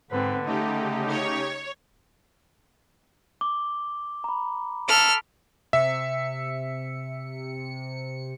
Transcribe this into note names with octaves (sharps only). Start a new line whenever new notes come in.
G#2 D3 C4 B4
C#3 A3 D#4 G4
C#5
D6 G7
A#5 B5
A4 F6 B6 D7
C3 E5 C#7